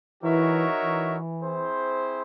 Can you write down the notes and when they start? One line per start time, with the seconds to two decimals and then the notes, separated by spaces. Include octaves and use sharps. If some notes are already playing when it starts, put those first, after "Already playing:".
0.23 E3 D#4 F#4 A#4 C#5 E5
0.83 E3
1.43 C4 E4 G#4 C5